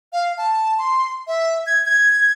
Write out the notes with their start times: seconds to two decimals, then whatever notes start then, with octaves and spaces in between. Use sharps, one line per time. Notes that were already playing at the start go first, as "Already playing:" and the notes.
0.13 F5
0.38 A5
0.78 C6
1.27 E5
1.66 G#6
1.86 G#6